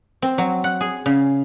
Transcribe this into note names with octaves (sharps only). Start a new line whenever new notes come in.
C4
F#3
F#5
G#4
C#3